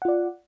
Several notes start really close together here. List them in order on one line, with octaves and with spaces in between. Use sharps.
F#5 F4 D5